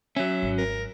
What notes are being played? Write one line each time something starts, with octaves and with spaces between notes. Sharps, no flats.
F#3 C#4 E5
G#1
A#4